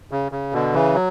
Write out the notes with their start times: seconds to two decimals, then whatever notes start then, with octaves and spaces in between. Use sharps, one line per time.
0.11 C#3
0.32 C#3
0.53 B2 D3
0.74 C#3 E3
0.95 F#3